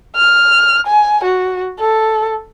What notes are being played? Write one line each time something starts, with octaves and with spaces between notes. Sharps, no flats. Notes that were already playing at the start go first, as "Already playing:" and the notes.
F6
G#5
F#4
A4